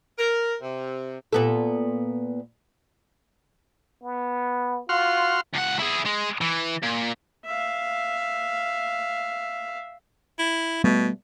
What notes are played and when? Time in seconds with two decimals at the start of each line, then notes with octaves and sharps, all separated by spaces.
0.17 A#4
0.62 C3
1.33 A#2 B3 A4
4.04 B3
4.89 F4 F#4 C6 F6
5.54 C#2 F#5
5.79 E4 G#4
6.06 G#3
6.41 E3
6.83 A#2
7.45 E5 F5
10.39 E4
10.84 B2 G3 A3 B3